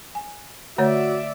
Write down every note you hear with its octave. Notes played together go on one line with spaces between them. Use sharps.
G#5
D3 A3 F#4 C#5 D5 E5